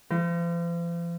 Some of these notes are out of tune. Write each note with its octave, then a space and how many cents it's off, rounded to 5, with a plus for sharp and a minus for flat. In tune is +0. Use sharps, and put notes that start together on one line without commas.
F3 -40